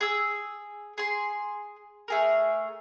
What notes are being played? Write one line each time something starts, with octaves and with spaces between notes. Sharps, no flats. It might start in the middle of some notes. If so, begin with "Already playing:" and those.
G#4 E6
G#4 C6
A3 G#4 A#4